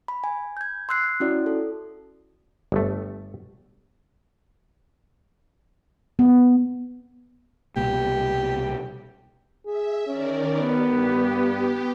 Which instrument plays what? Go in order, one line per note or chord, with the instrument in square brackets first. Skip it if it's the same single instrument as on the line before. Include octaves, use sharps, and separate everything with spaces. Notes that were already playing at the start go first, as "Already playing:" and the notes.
[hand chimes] B5
G#5
G6 G#6
C6 E6 F#6 C7
C#4 E4 F#4 D5
A4
[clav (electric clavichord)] G1 A3
[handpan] B3
[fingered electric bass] C2 B2 A#3 [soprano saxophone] G4
[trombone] G#4 [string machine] E5
[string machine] D#3 A#4 D5 [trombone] C#4
[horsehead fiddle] B3 [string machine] G4
[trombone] G2